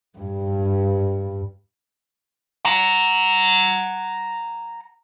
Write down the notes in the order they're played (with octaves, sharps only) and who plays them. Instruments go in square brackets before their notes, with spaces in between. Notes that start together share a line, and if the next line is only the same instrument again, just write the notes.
[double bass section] G2
[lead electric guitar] F#5 A#5